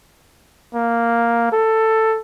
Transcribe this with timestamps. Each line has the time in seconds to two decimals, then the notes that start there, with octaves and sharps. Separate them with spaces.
0.74 A#3
1.52 A4